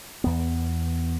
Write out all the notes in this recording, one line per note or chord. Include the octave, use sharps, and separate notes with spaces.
E2 B3